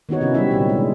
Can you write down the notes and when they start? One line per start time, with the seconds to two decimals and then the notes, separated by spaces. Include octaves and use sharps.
0.09 D#3 B3 D#4 F#4 C#5
0.21 C3 D#3 C#4 E4
0.34 F#3 G3 C4 E4 E5
0.51 A#2 D3 D#3 F#3
0.69 G#3